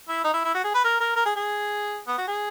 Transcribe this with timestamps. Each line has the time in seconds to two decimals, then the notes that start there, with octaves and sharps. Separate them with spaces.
0.08 E4
0.24 D#4
0.34 E4
0.45 E4
0.55 F#4
0.64 G#4
0.74 B4
0.84 A#4
1.00 A#4
1.16 A#4
1.26 G#4
1.36 G#4
2.07 B3
2.18 F#4
2.27 G#4